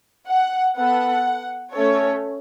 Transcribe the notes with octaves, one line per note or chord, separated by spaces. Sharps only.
F#5
B3 A4 F#5
A3 C#4 A4 C#5